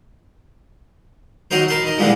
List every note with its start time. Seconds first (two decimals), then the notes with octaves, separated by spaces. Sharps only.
1.51 D#3 F#3 D#4 A#4 C5
1.68 A#4 A5 B5 C6
1.83 D#3 D#5
1.98 A#2 D3 E3 F3 G3 G#3